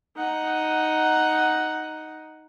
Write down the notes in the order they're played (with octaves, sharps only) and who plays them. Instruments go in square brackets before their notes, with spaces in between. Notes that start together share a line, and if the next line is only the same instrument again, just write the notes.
[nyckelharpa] D#4 F#5